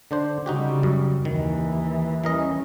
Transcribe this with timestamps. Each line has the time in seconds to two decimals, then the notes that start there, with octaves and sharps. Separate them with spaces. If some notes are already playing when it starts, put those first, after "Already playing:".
0.11 D3 D4 C5
0.46 C#3 G3 D#4 F#4 G4
0.83 F#2
1.25 D#2 D#3 E3
2.24 E3 G3 C#4 A#4 D#5